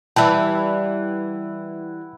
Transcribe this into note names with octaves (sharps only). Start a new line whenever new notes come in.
E3 G3 E4 E5 F#5 G5 A5